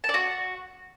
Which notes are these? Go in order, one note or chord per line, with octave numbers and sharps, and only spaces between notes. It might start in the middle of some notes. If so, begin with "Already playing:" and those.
A5
D5
F#4